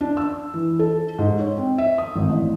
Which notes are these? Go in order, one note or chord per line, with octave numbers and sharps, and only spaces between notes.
D4
E6
E3
A4
G#2
C#5
C4
E5
D#6
G#1
A1